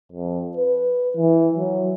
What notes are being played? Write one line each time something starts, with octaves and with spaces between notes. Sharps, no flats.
F2
B4
E3
F#3